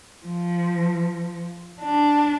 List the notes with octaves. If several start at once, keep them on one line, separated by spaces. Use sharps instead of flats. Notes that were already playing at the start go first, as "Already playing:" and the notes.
F3
D4